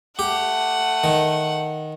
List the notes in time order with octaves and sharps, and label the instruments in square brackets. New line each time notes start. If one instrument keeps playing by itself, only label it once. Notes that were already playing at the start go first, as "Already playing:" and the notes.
[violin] A3 F#5 [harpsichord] G4
[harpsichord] D#3